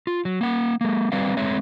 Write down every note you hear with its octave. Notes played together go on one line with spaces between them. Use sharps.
F4
F#3
A#3 F#5
G#3 A#3
G3 C4 B4 D5 F5
G#3 A3 C4 C#5 E5